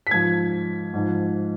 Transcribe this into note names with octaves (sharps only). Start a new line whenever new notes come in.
B6
G#2 F3 G#6
G#2 F3